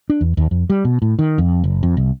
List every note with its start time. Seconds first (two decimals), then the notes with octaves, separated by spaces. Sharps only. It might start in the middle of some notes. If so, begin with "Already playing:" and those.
0.10 D4
0.21 E2
0.37 D#2
0.51 F2
0.70 G3
0.85 B2
1.02 A2
1.19 D#3
1.38 F2
1.64 F#1
1.83 F2
1.97 C2